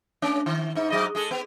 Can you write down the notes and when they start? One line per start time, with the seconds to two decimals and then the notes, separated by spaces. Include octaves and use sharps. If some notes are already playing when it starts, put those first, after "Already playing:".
0.22 A3 C#4 D4
0.46 D#3
0.75 G#2 D#4
0.90 G#2 F#3 D#5
1.15 G#3 G#4 A4
1.31 B3